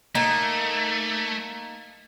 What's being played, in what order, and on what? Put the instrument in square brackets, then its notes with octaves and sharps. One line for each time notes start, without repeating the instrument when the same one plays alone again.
[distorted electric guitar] A3 [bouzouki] A#3 D#4